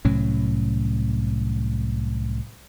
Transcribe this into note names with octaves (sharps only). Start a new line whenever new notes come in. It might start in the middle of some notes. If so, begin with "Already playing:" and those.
C2 A2 F#3 C#4